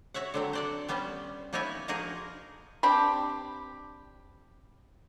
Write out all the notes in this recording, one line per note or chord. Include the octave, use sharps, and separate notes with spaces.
F#4 C#5 E5 F#5
D3 F#3 C4
C5 D5 F#5
G3 B3 C#4 C5
A#3 B3 D#4 E4 C#5 G#5
F3 A#3 D#4 F#4 G#4 A#4
C4 D4 G4 B5